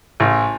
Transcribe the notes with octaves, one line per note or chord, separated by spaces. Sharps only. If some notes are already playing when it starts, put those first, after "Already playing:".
A1